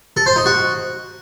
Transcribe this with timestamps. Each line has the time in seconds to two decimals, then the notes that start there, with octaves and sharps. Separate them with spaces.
0.17 A4
0.26 C5
0.36 D#4
0.46 F#4